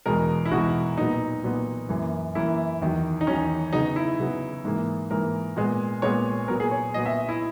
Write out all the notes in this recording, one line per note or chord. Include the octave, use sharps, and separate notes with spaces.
E2 B2 G#3 A#4
E4
E2 B2 G#3 F#4
A#2 F#3 B3 D#4
A#2 F#3 B3
F#2 E3 A#3
F#2 E3 A#3 E4
E2 D#3 F#3
D#4
E2 D#3 F#3 C#4
C#3 F#3 B3 D#4
E4
C#3 F#3 B3
G#2 E3 A#3
G#2 E3 A#3 A#4
A#2 G#3 B3
A#2 G#3 B3 C#5
A#2 F#3 B3 A#4
G#4
C#5
A#2 F#3 B3 D#5
E5
E4